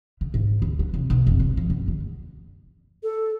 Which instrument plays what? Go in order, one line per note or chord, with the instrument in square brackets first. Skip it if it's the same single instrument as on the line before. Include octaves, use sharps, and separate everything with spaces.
[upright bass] C#3
G#2
D2
F#3
C2
B1
F1
C3
F3
F#2
D3
[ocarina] A4